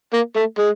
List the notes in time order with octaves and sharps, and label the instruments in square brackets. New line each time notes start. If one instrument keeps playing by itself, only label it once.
[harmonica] A#3
A3
G#3